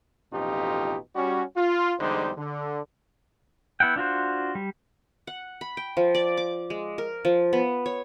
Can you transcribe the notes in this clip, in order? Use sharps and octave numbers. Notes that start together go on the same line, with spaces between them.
A1 F2 B2 D#4 F4 G4
G3 C#4 F#4
F4
E2 D3 G3 G#3 D#4 C5
D3
B3 E4 F#5 G5
D4 F4 F#4 C5
G3
F#5
B5
G5
F3
D5
D6
G#3
A#4
F3
B3
C#5